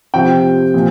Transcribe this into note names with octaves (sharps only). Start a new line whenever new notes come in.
C3 F3 C4 G5
A#2 F3